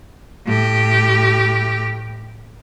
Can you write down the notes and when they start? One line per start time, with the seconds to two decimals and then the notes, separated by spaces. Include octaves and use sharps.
0.46 A2 G4